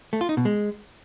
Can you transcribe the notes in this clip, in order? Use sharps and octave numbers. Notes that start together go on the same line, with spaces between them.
A3
F4
D#4
B2
G#3